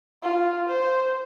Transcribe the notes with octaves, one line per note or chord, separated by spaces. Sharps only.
F4
C5